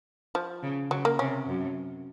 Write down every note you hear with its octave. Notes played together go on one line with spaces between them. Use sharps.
F3
C#3
C#3 F#3
A#3
C3 C#4
F#2